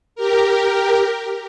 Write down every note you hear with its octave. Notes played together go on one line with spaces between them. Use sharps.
G4 A#4